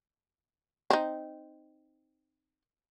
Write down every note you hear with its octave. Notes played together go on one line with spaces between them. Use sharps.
C4 D#4